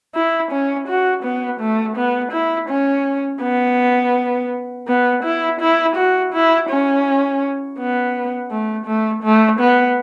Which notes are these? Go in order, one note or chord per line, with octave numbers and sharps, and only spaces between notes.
E4
C#4
F#4
B3
A3
B3
E4
C#4
B3
B3
E4
E4
F#4
E4
C#4
B3
A3
A3
A3
B3